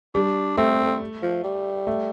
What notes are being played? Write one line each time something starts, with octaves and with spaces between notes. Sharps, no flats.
G3 D4
A3 C4
F3
G3
A3